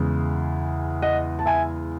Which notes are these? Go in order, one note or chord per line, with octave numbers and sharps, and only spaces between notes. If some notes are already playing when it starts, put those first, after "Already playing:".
Already playing: E2 C#3 G#3
D#5 F#5
A5
E5 G#5